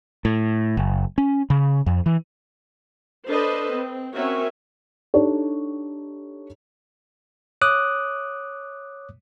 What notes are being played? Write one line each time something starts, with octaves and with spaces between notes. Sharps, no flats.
A2
F#1
C#4
C#3
F2
E3
D4 A4 B4 C5 D#5
C4
C4 C#4 F#4 A#4 C#5 E5
D4 D#4 G4 A4 C#5
C#5 D6 D#6 F#6